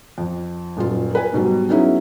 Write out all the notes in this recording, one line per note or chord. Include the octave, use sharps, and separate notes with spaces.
F2
D#1 F#2 F4
A#4 B4 G#5
G#2 B2 F#3 G3
F#3 B3 C#4 D#4 E4 G#4